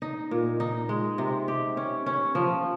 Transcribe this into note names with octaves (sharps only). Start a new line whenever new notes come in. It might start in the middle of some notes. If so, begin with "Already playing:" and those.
D#4
A#2
D#4
G#3
C3
G4
C#4
C#4
F3